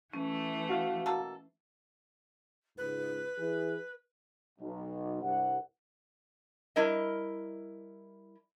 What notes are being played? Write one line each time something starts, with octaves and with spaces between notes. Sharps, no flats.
E3 A3 C#4
F#4 F5
B2 A#3 A4
C#2 G#2 B4
E3 G#4
B1
C2 G2 F#5
G3 E4 A#4 D#5